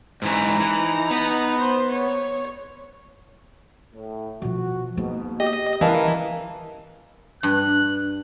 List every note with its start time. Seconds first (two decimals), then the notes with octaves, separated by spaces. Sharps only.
0.22 G#2 E3 D#4 A#5
0.60 E3
1.11 B3
1.59 C5
1.91 C#5
3.93 A2
4.42 B2 F3 F#4
4.97 G#2 B2 A#3
5.40 G4 D#5
5.81 E3 C#4 A#4 D#5 F5 A5
7.43 G2 F#6